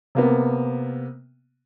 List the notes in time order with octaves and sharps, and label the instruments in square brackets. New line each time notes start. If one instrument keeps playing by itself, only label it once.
[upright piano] C3 A#3 B3